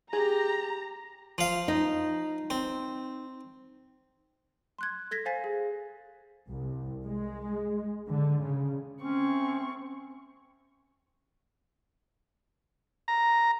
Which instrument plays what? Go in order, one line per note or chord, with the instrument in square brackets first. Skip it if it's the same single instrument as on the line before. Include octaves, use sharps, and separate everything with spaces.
[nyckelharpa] G4 [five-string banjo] G#4 [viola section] A#5
[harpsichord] F3 F5
[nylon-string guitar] D#4
[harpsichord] C4
[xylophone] C6 F#6 G#6
A4 G#6 A#6 B6
C5 F5 G#5 A6 B6
G#4
[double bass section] C2
G#3
D3
C#3
[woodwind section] A3 C#4 [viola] C4 C#6
[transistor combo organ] A#5